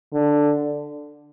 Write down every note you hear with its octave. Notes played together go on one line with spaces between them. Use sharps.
D3